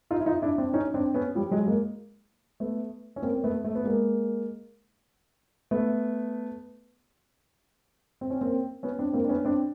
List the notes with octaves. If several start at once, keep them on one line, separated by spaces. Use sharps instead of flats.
D#4 F4
E4
D#4 F4
D4 E4
C4 D4
C#4 D#4
C4 D4
B3 C#4
F3 G3
F#3 G#3
G#3 A#3
A3 B3
C#4
A#3 C4
A#3
A3 B3
A3 B3
B3
G#3 A#3
A3 B3
C4
C#4
A#3 C4
B3 C#4
C4 D4
A#3 C4
D4
B3 C#4
C4 D4